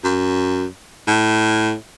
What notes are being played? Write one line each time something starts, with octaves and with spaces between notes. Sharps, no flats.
F#2
A2